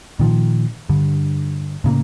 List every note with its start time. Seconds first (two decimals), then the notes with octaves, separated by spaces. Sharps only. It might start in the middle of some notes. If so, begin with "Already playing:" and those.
0.19 A#2 D#3 F3
0.89 G2 D3
1.84 A2 C#3 A#3